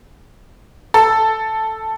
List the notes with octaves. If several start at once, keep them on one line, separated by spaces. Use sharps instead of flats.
A4